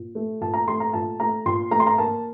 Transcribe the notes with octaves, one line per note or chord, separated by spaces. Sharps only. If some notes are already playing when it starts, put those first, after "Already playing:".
Already playing: A#2
A3
A#2 A5
A#5
A3 C6
A#5
A#2 A5
A3 A#5
A#2 C6
A3 A#5
C6
A#5
A#3 A5